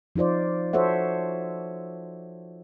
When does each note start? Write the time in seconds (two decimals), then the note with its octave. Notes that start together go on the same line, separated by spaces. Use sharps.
0.16 F3 D#4 F4 C5 D5
0.73 F#4 A4 C5 C#5 E5 F#5